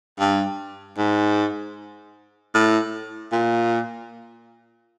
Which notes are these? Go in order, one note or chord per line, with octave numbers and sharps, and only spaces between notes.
G2
G#2
A2
A#2